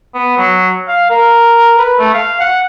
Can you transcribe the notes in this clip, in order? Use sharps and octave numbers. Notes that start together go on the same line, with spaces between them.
B3
F#3
F5
A#4
B4
A3
F5
F#5